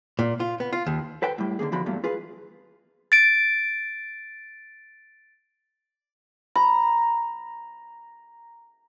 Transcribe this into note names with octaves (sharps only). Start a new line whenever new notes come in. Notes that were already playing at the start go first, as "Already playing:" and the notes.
A#2
F4
B3
F4
D#2
A4 B4 C5 G5
A2 G3
D3 D#3 A#3 G#4
E2 D3 F3 F#4 B5
E2 G2 F#3 A3 A#3
F4 G#4 B4
A6 D7
A#5 B5